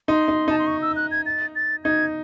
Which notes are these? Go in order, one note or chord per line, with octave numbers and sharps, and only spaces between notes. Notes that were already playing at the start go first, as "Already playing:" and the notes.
D#4 C6
D#4
D#4 A5
C6
C#6
E6
F#6
G#6
A6
A6
D#4 G#6